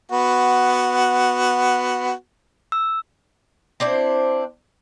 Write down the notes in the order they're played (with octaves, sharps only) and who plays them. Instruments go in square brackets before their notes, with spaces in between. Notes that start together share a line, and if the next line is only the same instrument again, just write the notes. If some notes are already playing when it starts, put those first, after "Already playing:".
[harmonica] B3 F#4
[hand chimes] E6
[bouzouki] C4 D4 E4 C5